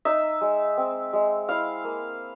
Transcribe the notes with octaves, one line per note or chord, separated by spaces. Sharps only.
D#4 E5
G#3
C4
G#3
E4 F5
A#3